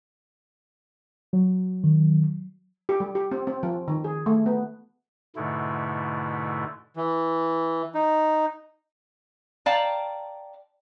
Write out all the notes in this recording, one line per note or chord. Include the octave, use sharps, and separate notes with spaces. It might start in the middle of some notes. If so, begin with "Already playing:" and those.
F#3
D#3
G4
G3
G4
C4
C4
F3
D#3
G#4
A3
B3
G#2 B2 D3 A3 E4
E3
D#4
D5 F5 G5 A5 A#5